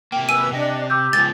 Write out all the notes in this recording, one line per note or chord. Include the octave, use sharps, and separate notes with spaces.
C3 A#3 G5
B4 G#5 E6 D#7
C3 D4 D#5 G5
G4 D6 E6 G6
C#2 F3 A6